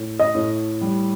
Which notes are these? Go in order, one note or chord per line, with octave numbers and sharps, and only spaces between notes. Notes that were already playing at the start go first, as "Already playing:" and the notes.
Already playing: A2
D#5
A2
G3